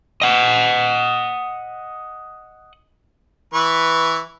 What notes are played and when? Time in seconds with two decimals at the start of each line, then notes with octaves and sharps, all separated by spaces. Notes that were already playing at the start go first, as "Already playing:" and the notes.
0.22 D#5 F#5
3.54 E3 B4 C#6